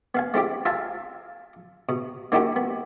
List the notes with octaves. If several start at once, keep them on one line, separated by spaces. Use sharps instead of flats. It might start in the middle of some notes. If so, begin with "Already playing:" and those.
B3 F5 G#5
A3 C4 E4 G4
F4 E5 F5 G#5 A5
B2
A#3 C#4 D#4 E4 F#4 G4
B3